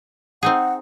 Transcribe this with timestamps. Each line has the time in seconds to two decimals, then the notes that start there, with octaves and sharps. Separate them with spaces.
0.43 C4 D#4 G#4 F#5